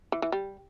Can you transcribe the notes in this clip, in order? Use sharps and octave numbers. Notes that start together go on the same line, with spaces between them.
E3
E3
G3